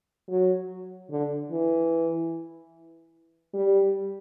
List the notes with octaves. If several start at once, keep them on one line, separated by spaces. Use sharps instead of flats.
F#3
D3
E3
G3